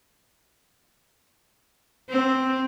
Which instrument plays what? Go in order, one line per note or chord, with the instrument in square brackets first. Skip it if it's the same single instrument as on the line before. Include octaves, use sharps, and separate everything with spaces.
[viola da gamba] C4